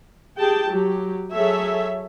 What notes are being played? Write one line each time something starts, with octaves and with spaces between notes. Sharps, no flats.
G4 G#4 G5 A5
F#3 G4
F#3 G#4 A4 C#5 E5